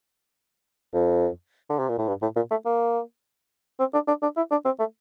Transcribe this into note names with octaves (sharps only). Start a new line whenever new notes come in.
F2
D3
C3
A#2
A2
G2
A2
A#2
A3
A#3
C4
D4
D4
D4
E4
D4
C4
A3